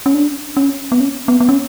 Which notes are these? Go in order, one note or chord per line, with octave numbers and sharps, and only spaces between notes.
C#4
D4
C#4
B3
C#4
B3
B3
C#4